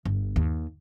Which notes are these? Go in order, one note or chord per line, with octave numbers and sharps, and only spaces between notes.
G1
D#2